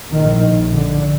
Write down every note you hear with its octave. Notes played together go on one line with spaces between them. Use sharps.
A#1 A2 D#3
D3